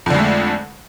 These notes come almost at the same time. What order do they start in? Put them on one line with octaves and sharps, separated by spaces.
F2 D3 G#3 A3